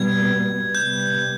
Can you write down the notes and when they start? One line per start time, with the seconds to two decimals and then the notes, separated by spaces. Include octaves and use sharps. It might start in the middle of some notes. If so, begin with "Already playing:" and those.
Already playing: B2 G3 B3 G#6
0.75 C3 G3 B3 G6